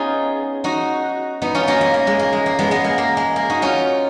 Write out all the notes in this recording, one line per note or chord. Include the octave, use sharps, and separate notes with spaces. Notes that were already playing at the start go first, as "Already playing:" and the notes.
Already playing: B3 C#4 D#4 F4 G#4
D#4 F#4
B3 D#4
C#4 F4
A#3 C#4
A#3
A#3
G#3
A#3
G#3
A#3
G#3 B3
G#3 B3
A#3
A#3
G#3
A#3
D#4 F#4
C#4 F4